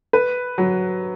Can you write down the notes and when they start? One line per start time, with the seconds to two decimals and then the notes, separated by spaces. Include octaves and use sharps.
0.13 B4
0.58 F#3